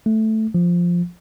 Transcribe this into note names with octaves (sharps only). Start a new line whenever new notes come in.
A3
F3